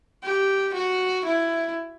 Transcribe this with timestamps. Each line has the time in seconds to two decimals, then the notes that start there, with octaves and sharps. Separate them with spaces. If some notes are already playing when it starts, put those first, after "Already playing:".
0.23 G4
0.74 F#4
1.25 E4